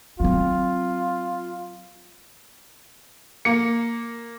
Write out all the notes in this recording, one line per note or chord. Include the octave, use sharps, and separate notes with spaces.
F#3 C4 F4
A#3 C#7